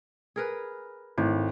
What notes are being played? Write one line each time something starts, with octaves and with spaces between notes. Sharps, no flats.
G#4 A#4 B4
G#1 A2